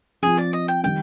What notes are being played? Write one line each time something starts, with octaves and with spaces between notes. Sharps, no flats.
F3 C4 F4 G#4
D5
D#5
G5
D#3 G3 G5